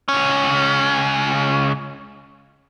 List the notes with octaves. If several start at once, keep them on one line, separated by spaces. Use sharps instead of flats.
C#2 C#4